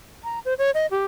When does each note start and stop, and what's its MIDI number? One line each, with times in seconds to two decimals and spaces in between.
0.24 0.39 82
0.45 0.54 72
0.58 0.71 73
0.74 0.87 75
0.91 1.05 67